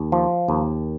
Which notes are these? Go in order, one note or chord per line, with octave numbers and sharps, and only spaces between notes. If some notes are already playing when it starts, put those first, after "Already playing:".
Already playing: D#2
F3
D#2